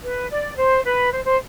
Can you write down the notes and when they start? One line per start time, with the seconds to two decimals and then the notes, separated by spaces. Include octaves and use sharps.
0.04 B4
0.31 D5
0.57 C5
0.85 B4
1.11 C5
1.26 C5